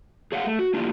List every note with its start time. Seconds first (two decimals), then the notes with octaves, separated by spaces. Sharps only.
0.32 G#4 C#5 F5 F#5
0.46 A3
0.59 F#4
0.74 A3 A#3 D4 E4 F4 G4